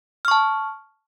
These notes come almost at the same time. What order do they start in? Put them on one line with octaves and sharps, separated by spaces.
F6 C#6 A5